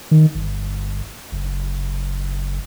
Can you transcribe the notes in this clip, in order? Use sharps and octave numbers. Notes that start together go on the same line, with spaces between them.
D#3
G1
F#1